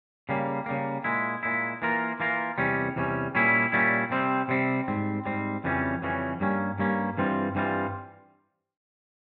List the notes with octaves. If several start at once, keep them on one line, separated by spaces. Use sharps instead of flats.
C#3 G3 A#3
C#3 G3 A#3
A#2 G#3 E4
A#2 G#3 E4
E3 A#3 F4 A#4
E3 A#3 F4 A#4
E2 C3 G3 C#4
E2 C3 G3 C#4
A#2 G3 C#4 E4
A#2 G3 C#4 E4
C3 G3 C4
C3 G3 C4
G#2 G3 C4
G#2 G3 C4
F2 C#3 E3 G3 C#4
F2 C#3 E3 G3 C#4
G2 G3 A#3 C#4
G2 G3 A#3 C#4
G2 E3 G3 C4 F4
G2 E3 G3 C4 F4